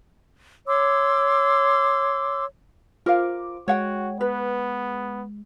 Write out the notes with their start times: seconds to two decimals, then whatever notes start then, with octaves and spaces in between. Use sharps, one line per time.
0.68 C#5 C6 D6 E6
3.06 F4 A#4 C5 F5 D6
3.68 G#3 F#4 C#5 F#5 G5
4.21 B3 B4